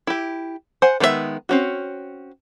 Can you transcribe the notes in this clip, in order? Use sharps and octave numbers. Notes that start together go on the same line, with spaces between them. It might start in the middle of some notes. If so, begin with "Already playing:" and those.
E4 G4
C5 F#5 G#5
D#3 G#3 B3 E4 E5
C4 C#4 F#4